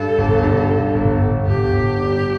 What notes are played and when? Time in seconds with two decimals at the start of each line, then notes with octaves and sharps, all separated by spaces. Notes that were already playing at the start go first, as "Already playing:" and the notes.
Already playing: G2 A4
0.18 G1
0.43 G2
0.69 G2
0.95 G1
1.20 G1
1.47 G1 G4
1.73 G1
1.98 G3